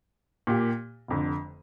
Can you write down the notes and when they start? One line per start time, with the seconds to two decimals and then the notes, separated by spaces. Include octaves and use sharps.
0.47 A#2 A#3 G4
1.08 F1 F2 D3